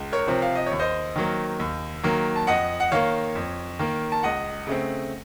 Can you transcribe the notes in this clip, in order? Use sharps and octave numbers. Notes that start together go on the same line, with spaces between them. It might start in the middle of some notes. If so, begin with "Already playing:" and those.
Already playing: C#2
A#4 C#5
C3 F3 C4
F5
D#5
D#2 C#5
C5 D#5
D#3 F#3 A#3
D#2
D#3 F#3 A#3
A5
F2 D#5 F#5
F#5
D#3 A#3 C#5 F5
F2
D#3 A#3
A5
C#2 D#5 F#5
C#3 A3 C4